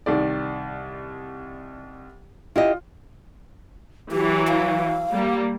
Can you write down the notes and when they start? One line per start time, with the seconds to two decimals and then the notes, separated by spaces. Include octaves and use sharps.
0.06 C2 D#3 D5
2.56 E4 F4 G4 D#5
4.12 E3 F#3 G4
4.48 F5
5.12 G3 A#3